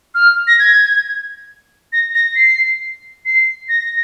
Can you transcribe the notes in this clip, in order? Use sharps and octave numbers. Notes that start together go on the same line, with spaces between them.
F6
A#6
G#6
A#6
A#6
C7
C7
A#6